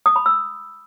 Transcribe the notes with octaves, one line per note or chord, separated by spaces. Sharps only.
D#6
B5
E6